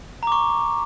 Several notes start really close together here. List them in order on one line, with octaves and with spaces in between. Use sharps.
A#5 D6 C#6